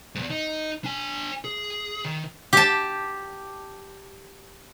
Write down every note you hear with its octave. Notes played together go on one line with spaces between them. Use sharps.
E2 G#2
D#4
D4 G#5
G#4
D#3
G4 A5